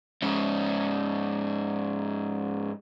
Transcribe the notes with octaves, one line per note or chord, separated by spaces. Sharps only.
G#2 C#4